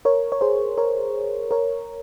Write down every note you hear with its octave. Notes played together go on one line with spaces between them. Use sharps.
A#4 C#5
C#5
G#4 C5
A#4 C#5
A#4 C#5